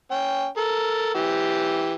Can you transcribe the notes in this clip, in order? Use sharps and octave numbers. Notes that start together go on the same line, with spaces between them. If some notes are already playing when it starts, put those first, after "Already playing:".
C#4 G5
A4 A#4
E3 G4